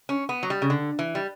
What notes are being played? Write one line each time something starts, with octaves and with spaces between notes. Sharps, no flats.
C#4
B3
F#3
G3
C#3
D3
E3
G3